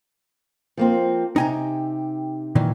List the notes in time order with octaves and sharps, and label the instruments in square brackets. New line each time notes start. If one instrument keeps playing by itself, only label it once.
[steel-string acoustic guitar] F3 A#3 C4
[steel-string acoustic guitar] C3 G4 [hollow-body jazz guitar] D#4 G#5 A#5
[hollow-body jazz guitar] A#2 D#3 E3